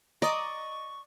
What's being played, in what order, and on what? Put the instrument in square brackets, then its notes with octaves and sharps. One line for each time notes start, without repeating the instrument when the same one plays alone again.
[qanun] D5 [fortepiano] D#5 [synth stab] A#5 D#6 [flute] C#6